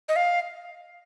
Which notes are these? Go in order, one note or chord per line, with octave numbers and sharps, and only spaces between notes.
D#5
F5